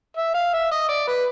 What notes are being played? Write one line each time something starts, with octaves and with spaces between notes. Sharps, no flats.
E5
F5
E5
D#5
D5
B4